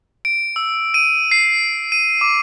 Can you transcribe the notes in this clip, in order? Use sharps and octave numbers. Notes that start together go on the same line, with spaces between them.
D7
E6
D#7
C7
D#7
D6